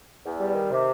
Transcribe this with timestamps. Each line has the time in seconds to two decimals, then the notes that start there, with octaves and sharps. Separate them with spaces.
0.24 E2
0.39 G3
0.55 D#3
0.71 C3